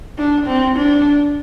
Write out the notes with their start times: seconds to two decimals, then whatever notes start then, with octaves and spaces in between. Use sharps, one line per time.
0.18 D4
0.46 C4
0.76 D4